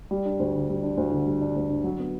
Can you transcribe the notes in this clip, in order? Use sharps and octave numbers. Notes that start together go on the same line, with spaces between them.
G3
D4
D2
D3
G3
D4
D2
D3
G3
D4
D2
D3
F#3
B3